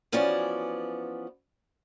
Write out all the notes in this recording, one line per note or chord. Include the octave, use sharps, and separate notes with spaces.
E3 F3 B3 C#4 F#4 D5